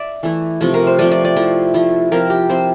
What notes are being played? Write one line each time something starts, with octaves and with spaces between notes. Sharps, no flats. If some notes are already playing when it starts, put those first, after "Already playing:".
Already playing: D5 E5
E3 A3 E4
C3 F3 A3
A#4
C5
C3 F3 A3 D5
D5
D5
F3 A3 E4
F3 A3 E4
F3 C4 E4 A#4
G4
F3 C4 E4 C5